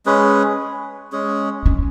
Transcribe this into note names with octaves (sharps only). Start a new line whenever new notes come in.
G#3 C#4 G#4 B4
G#3 C#4 G#4
C#4